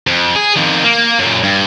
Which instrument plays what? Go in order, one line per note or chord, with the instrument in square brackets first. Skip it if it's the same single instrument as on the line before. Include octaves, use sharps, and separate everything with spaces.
[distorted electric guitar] F2
G#4
F2 D#3
A#3
F#2 A#2
G2